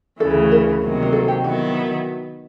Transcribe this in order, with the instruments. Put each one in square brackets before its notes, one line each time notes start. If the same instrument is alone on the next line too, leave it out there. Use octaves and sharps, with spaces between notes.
[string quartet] D2 C#3 E3 [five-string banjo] A4
[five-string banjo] A#4
[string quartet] C3 D#3 F#3 A#3
[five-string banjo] A#4
A4
G4
[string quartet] D#3 F#3 B3 E4 [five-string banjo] F#4